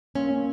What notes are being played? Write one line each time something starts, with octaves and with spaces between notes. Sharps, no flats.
A#3 C#4
A#3